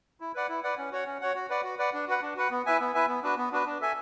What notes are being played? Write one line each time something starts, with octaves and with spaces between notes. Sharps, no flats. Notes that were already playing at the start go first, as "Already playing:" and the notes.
E4
B4 D5 F#5
E4
B4 D5 F#5
C#4
F#4 C#5 F#5
C#4
F#4 C#5 F#5
F#4
B4 D5 F#5
F#4
B4 D5 F#5
D4
F#4 B4 F#5
D4
F#4 B4 F#5
B3
E4 B4 E5 G#5
B3
E4 B4 E5 G#5
B3
D4 F#4 B4
B3
D4 F#4 B4
D4
A4 E5 G#5